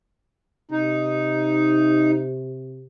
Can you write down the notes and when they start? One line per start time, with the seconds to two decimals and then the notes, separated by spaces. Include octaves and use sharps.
0.71 C3 D#4